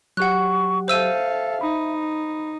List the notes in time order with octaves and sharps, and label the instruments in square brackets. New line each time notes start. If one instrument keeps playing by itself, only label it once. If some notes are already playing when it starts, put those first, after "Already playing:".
[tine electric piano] F#3 G4 [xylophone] F#5 F#6 [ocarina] C#6
[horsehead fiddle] A4 F5 [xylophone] C5 E6 D#7 [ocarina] E5
[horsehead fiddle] D#4 [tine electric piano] B5